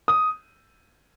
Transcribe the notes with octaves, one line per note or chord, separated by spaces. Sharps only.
D#6